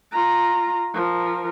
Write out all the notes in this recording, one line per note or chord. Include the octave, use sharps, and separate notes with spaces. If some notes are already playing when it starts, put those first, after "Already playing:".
F4 A#5
F3 A#4